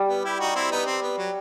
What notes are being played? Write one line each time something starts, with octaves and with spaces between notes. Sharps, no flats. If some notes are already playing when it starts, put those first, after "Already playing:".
Already playing: G3
B3
E4 G4
D#4 F#4
C4 E4
B3 D#4
C4
B3
F#3